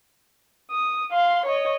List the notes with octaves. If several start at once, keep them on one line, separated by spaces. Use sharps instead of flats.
D#6
F5 C6
C#5 D#5